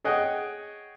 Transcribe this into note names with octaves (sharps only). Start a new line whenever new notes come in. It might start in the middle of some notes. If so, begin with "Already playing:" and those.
G#4 C#5 D#5 F#5 G5